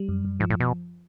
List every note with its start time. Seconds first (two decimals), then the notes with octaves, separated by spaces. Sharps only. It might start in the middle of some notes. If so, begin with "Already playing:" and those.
Already playing: G3
0.09 F#2
0.25 F#2
0.40 G#2 F3
0.50 A2
0.60 B2